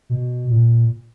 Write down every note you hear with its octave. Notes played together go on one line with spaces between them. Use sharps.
B2
A#2